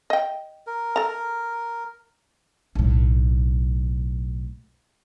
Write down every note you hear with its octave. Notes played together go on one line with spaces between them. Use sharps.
D#5 G5
A#4
A4 A#5
B1 A2